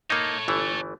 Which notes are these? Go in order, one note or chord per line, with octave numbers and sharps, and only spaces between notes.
A#3 D#4 A4 C#5
G1 E3 A3